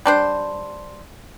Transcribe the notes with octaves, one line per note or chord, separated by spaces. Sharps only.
G3 D4 C5